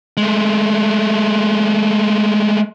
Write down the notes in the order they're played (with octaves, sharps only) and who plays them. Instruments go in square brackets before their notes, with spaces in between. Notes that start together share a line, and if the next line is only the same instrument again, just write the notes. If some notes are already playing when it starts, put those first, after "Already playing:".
[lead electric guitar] G#3 A3